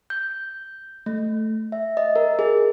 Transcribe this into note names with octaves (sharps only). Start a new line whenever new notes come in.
G6
A3
E5
D#5
A#4
G#4